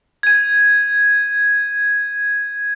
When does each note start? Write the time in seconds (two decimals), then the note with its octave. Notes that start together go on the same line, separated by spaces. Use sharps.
0.23 G#6 D#7